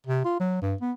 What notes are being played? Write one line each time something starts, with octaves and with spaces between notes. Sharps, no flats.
C3
F4
F#3
G2
B3